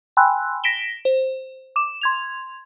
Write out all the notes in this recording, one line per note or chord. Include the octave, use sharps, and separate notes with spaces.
G5 G#5 B5 C6 E6 F#6
A#6 B6 D7 E7 G7
C5
D6 E7
C6 G#6 F7